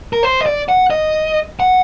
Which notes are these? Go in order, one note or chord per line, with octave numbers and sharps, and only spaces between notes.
A#4
C5
D#5
D5
F#5
D#5
F#5